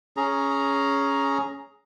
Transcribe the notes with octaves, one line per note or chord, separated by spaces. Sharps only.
C#4 G#4 A#5